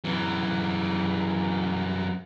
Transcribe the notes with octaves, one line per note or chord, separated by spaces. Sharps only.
F#2 E3